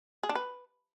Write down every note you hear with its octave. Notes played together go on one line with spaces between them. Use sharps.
G#4
D4
B4